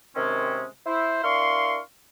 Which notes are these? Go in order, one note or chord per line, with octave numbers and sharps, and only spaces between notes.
C3 D#3 G#3 C4 C#4
E4 C5
D4 E4 A#4 F5 C6 C#6